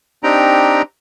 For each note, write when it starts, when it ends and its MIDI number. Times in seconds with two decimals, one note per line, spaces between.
0.24 0.82 60
0.24 0.82 62
0.24 0.82 63
0.24 0.82 67
0.24 0.82 79
0.24 0.82 82